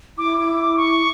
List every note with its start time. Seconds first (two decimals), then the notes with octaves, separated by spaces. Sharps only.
0.18 E4 D6
0.38 D6
0.58 D6
0.77 C#6